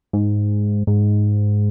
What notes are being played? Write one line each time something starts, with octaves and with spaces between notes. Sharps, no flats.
G#2
G#2